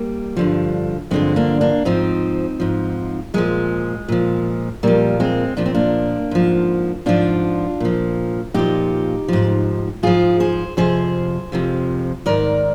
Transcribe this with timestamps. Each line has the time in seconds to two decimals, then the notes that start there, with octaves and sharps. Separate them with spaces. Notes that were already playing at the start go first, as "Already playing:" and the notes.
Already playing: G3 A#3
0.37 G2 D3 F3
1.11 G2 D3 F3 G#3 C4
1.36 A#3 D4
1.61 A#3 D4
1.85 G#2 F3 C4 D#4
2.60 G#2 F3
3.34 A#2 F3 G#3
4.08 A#2 F3
4.83 A#2 F3 G3 A#3
5.20 G#3 C4
5.57 A#2 F3 D4
5.66 C4
5.75 A#3 D4
6.31 G#2 F3
7.06 G#2 F3 D4 F4
7.80 A#2 F3
8.54 A#2 F3 D#4 G4
9.28 G#2 F3
10.03 G#2 F3 F4 G#4
10.40 G#4 C5
10.77 F2 C3 F3 G#4 C5
11.52 F2 C3 F3
12.26 G#2 D#3 A#4 D5